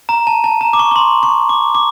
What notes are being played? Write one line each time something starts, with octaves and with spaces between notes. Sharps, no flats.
A#5
A5
A5
A#5
D6
C#6
C#6
C6
C#6
D6
D6